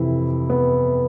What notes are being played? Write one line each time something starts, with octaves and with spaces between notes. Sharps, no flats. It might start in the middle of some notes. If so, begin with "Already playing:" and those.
Already playing: F2 C3 E3 E4
B3